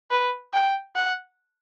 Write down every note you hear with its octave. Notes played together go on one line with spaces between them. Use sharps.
B4
G5
F#5